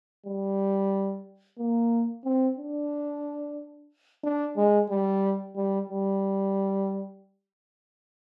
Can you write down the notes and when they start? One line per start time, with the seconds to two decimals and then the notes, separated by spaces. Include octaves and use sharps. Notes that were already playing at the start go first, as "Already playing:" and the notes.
0.26 G3
1.58 A#3
2.25 C4
2.58 D4
4.24 D4
4.56 G#3
4.90 G3
5.56 G3
5.90 G3